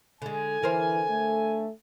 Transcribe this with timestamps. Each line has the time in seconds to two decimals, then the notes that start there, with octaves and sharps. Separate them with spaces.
0.22 D3 G#3 G#5
0.62 D3 E3 A#4 C5
1.10 A3